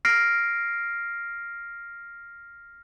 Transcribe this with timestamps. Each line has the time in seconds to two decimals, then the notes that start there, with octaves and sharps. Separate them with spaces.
0.05 F6 A#6 C7 D7